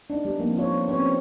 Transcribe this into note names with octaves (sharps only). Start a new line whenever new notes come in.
D4 D#4
G3 B3 D#4
F3 A#3 C4 D4
F4 C#5
B3
C4 C#4 B4 C#5